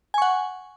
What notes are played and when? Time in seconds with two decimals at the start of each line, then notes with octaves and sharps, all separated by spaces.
0.14 G#5
0.18 C#6
0.22 F#5